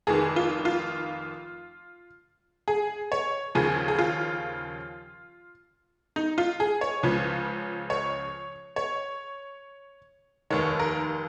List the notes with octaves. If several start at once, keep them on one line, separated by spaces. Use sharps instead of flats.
F1 F2 D#3 G#4
F4
F4
G#4
C#5
D#2 C#3 F3 G#4
G#4
F4
D#4
F4
G#4
C#5
C#2 C#3 F3
C#5
C#5
F1 D#2 D#3 C#5
A#4